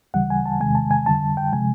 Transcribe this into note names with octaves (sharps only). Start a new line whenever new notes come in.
D2 C#3 E3 G3 F#5
G#5
A5
E2 C3 D#3 G#3 G#5
A5
G#5
F2 D3 G3 A5
G5
C3 F3 G#3 G#5